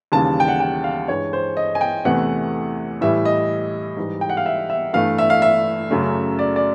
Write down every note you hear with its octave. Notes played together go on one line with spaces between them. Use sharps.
D#2 C#3 E3 G3 A5
G5
F#5
G5
F5
G2 E3 G#3 C#5
C5
D#5
G#5
G5
E2 C3 E3 A3 F#5
A2 E3 G3 E5
D#5
G#2 E3 G3
G5
F#5
F5
E5
E5
G2 E3 A3 F5
E5
F5
E5
F#2 C#3 F#3 A3
D5
D5